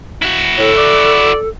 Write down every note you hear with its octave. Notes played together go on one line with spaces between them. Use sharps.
E4 F#4
A2 A4
D5